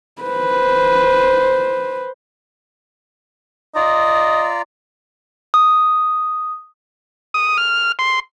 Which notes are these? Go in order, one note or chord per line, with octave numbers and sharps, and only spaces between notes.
B4 C5
F4 D5 D#5 A#5
D#6
D#6
F6
C6